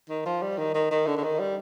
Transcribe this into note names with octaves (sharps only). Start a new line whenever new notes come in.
D#3
F3
G3
D#3
D#3
D#3
D3
D3
D#3
G3